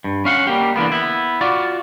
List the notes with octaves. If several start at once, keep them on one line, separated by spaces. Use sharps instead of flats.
G2
C#4 F5 F#5
G3 A#3 G4
D3 E3 A#3 B3
B3 E4
F4 F#4 D5